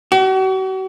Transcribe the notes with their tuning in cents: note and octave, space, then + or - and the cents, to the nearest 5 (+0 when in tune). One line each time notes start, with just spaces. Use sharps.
F#4 +40